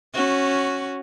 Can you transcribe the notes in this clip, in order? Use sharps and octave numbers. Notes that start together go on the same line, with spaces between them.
C#4 F#4